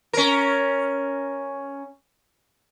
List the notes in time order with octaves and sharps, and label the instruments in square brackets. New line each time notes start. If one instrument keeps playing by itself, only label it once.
[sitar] C#4 A#4